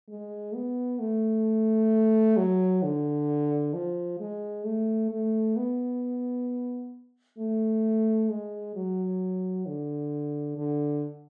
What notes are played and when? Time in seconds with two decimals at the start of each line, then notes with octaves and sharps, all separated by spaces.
0.09 G#3
0.55 B3
0.99 A3
2.37 F#3
2.83 D3
3.74 F3
4.20 G#3
4.65 A3
5.11 A3
5.56 B3
7.39 A3
8.30 G#3
8.75 F#3
9.66 D3
10.57 D3